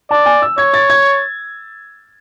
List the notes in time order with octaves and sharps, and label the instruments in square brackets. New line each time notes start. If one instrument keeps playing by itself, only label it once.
[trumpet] D5 [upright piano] A5
[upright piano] G#5
E6
[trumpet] C#5 [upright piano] G#6
[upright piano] A6
G#6